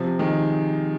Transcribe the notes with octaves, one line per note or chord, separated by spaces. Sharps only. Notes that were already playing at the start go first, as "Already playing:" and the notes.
Already playing: C3 F3
D#3 G#3